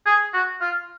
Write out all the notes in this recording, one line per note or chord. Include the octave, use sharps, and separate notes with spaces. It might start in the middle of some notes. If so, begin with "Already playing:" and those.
G#4
F#4
F4